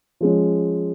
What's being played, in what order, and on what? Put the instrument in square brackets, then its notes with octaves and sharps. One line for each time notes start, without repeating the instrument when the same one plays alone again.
[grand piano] F3 G#3 C#4